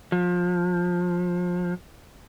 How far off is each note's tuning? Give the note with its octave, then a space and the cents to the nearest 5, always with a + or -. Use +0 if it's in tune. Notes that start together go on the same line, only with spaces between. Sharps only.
F3 +25